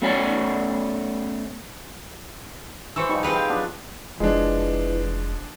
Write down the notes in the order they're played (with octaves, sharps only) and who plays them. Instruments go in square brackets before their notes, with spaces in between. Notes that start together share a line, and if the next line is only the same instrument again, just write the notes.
[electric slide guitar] A3 B3 C#4 C#5 D5 G#5
[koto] E3 [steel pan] C5 C#6 E6
[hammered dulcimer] F3 G3 [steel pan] D#4 C#6
[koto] C4 B4 F5 [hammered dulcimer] G#4
[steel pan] G5
[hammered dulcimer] F#3 B3 D4
[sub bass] F1 [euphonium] E3 [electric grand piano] F3 D4 [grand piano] G#3